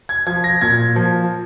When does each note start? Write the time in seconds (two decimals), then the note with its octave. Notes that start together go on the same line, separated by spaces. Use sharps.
0.09 G#6
0.27 F3 G#6
0.44 A#6
0.61 A#2 G#6
0.96 F3